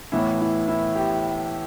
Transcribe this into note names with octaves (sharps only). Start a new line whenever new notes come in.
A2 E3 B3 E4
E4
E4
G4